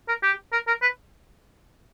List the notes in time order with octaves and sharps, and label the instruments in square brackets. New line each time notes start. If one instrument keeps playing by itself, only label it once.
[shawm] A#4
G4
A#4
A#4
B4